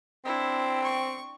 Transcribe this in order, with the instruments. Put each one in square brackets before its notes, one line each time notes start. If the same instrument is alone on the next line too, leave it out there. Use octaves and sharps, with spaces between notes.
[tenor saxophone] C4 [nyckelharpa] D4 E4
[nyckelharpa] C#6